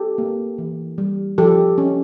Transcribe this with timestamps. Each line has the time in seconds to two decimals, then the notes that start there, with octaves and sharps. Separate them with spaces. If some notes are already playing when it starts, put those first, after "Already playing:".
Already playing: G4 A4
0.18 A#3
0.58 E3
0.98 G3
1.38 F3 G4 A4
1.78 C#4